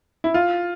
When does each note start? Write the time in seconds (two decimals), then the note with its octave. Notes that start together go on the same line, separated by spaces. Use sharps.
0.24 E4
0.34 F4